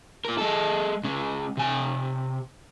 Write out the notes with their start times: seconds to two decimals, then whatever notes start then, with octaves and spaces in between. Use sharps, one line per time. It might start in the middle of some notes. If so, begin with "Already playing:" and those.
0.25 A#2 A#4
0.38 G#3 A4
1.03 C#2 C#3
1.57 C3 G#5